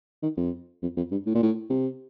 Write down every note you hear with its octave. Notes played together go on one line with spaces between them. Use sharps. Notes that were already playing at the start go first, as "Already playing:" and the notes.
D#3
F2
F2
F2
G2
A2
A#2
A2
C3